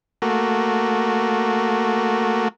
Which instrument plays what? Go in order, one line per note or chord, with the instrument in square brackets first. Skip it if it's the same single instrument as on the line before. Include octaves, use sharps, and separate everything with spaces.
[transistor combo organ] A3 A#3 F#4